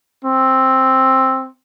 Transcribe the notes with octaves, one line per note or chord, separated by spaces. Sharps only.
C4